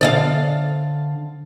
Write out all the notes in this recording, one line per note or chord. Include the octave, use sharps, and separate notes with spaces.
D3 D5 D#5 F5